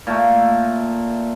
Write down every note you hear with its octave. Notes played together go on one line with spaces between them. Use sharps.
A#2 A3